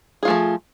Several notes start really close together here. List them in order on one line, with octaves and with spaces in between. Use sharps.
G#4 F4 A3 F3